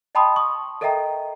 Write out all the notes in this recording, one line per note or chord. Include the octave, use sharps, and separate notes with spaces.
D#5 G5 A5 B5 C6 D#6
C#6 D#6
A4 A#4 D#5 E5 G5 A#5